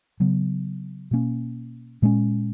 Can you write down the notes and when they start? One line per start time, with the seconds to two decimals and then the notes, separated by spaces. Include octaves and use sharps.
0.20 C#3 F#3 B3
1.11 B2 A#3 C#4
2.02 A#2 G#3 C#4